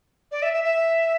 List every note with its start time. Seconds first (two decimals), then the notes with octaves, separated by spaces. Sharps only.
0.32 D5
0.42 E5
0.54 E5
0.64 E5